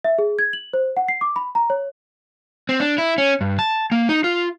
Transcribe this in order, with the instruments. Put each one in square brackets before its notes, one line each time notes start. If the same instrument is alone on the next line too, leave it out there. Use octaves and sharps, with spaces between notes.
[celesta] E5
G#4
G#6
F#7
C5
F#5
C7
D6
B5
A#5
C#5
[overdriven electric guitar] C4
D4
E4
C#4
G2
A5
A#3
D#4
F4